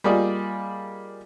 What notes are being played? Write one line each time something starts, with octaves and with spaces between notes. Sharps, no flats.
G3 A#3 F4 G#4 D5 D#5